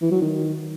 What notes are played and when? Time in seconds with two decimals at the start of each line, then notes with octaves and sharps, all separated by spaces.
0.01 E3
0.11 F#3
0.21 D#3